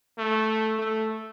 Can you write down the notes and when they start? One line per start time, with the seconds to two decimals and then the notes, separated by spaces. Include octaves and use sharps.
0.18 A3
0.79 A3